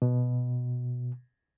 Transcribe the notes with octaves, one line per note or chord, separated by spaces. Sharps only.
B2